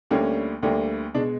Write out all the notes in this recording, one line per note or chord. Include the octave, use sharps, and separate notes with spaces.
D2 D3 G3 A#3 C#4
D2 D3 G3 A#3
B2 G#3 D4